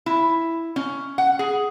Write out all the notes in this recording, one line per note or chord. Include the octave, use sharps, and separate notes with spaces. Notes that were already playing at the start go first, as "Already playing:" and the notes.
E4
C#4
F#5
G#4